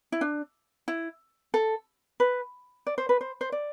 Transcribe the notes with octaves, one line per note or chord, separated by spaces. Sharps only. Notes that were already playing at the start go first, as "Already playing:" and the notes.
E4
D4
E4
A4
B4
D5
C5
B4
C5
C5
D5